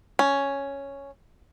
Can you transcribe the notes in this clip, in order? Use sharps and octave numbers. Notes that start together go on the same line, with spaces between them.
C#4